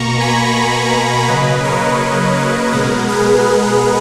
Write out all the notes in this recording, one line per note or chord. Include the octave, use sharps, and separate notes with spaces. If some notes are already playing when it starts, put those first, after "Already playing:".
Already playing: B2 A#3 A#5 C#6
G#5 B5
A#5 C#6
C#3 F#3 A#3 B4 D#5
A#4 C#5
A#4
B2 G#3 B3 A#4
G#4 B4